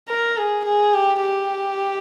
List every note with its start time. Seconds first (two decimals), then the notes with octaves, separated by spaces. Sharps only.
0.08 A#4
0.37 G#4
0.65 G#4
0.94 G4
1.21 G4